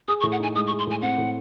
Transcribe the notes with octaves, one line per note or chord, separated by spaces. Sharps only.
G#4 D#6
C#6
A2
F#5
D#4 G#5
G#3 D#6
C#6
G#4
C6
A2 G#5
C4 F#5
A2